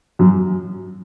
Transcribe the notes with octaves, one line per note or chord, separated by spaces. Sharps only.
F#2